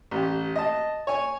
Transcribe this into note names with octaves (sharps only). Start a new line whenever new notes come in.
A1 G4
D#5 A5
C#5 G#5